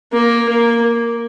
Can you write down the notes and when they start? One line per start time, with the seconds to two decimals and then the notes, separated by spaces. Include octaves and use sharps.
0.12 A#3
0.48 A#3